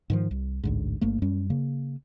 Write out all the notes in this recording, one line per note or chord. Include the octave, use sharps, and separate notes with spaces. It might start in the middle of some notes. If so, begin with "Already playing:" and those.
G#2 D#3 F3
C2
A1 D2 G#2
G1 G2 A3 A#3
F#2 G3 C#4
C#3 A#3